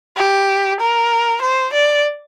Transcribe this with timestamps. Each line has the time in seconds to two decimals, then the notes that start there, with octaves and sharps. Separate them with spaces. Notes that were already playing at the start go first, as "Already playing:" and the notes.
0.17 G4
0.80 A#4
1.42 C5
1.73 D5